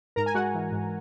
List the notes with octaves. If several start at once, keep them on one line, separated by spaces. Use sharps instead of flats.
G#2 A#4 A#5
G#5
G#3 F#4 F#5
E3
G#2